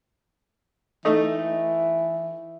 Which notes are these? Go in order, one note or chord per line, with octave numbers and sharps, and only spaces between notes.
E3 A3 D#4